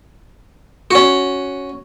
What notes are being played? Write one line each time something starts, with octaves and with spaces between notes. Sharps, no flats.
C#4 F#4